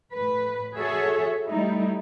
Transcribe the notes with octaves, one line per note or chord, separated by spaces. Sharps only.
A2 B4
F#4 G#4 A4 C#5 E5
G3 A3 D#4 E4